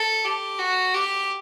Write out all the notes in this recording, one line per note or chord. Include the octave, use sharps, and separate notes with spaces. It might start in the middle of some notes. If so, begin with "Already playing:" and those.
Already playing: A4
G4
F#4
G4